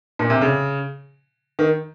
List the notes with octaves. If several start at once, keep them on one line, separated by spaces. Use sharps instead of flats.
A#2
C3
C#3
D#3